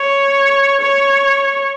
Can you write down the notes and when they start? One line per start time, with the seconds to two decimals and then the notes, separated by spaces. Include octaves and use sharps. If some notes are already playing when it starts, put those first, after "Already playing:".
Already playing: C#5
0.81 C#5